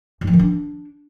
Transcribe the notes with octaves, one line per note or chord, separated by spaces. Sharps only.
G#2
F3
D#3
D4